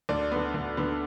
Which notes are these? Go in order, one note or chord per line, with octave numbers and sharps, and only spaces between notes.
D2 D5
D3 B3
D2
D3 B3